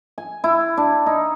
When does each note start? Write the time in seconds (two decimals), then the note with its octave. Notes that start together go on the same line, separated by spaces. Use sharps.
0.18 G#5
0.44 E4
0.77 D4
1.06 D#4